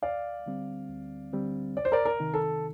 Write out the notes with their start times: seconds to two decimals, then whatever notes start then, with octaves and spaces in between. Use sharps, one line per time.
0.02 D2 D5 F5
0.46 D3 G3 C4
0.89 D2
1.33 D3 G3 C4
1.76 C2 D5
1.85 C5
1.92 A#4 D5
2.06 A#4
2.20 C3 D#3
2.34 A4